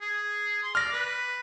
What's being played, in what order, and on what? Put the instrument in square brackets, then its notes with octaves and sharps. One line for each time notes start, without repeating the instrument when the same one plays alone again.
[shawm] G#4
C6
[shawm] D5 [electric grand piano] F6 A#6
[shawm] B4